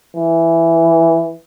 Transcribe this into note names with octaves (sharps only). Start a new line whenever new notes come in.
E3